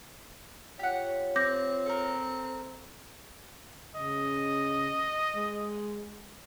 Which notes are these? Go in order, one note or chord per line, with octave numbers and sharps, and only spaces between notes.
F4 G4 C#5 F#5
C4 D6 G6 A#6
A4 A#4
C#3 D#5
G#3